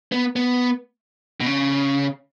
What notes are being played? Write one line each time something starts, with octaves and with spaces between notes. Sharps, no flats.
B3
B3
B2
C#3